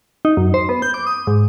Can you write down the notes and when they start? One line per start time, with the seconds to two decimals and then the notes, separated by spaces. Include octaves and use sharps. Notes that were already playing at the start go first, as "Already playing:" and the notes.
0.25 D#4
0.37 F#2
0.54 C5
0.69 B3
0.82 G6
0.94 D6
1.07 D#6
1.27 G#2